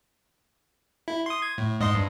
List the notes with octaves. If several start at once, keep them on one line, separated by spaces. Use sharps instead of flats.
E4
C6 D#6
G#6
A2
G#2 D#5 C6
G2